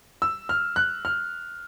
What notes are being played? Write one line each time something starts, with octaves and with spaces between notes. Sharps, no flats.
E6
F6
F#6
F6